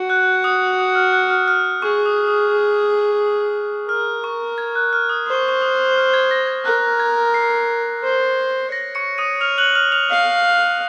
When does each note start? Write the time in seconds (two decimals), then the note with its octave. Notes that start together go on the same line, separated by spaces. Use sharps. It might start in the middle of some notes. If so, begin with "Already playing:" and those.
Already playing: F#4
0.10 F#6
0.44 D#6
0.79 D#6
0.95 F6
1.13 F#6
1.30 F6
1.48 F6
1.64 F6
1.82 G#4 C#6
2.06 D#6
2.28 D#6
3.88 A#4 F6
4.24 C#6
4.58 G#6
4.75 F#6
4.93 F6
5.09 D#6
5.27 C5 D#6
5.34 C#6
5.48 C#6
5.62 D#6
5.96 F6
6.14 G#6
6.31 A#6
6.47 G#6
6.65 A#4 F#6
7.00 G#6
7.34 C7
8.03 C5
8.72 C#5 A#6
8.95 C#6 C#7
9.18 D#6 D#7
9.41 F6 F7
9.58 F#6 F#7
9.75 F6 F7
9.92 F6 F7
10.10 F5